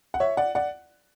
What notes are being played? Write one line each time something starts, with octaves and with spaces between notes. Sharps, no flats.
F#5
C#5 E5
D5 F#5
D5 F#5